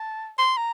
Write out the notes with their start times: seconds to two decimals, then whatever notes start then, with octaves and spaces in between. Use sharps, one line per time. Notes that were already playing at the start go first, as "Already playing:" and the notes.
Already playing: A5
0.39 C6
0.57 A#5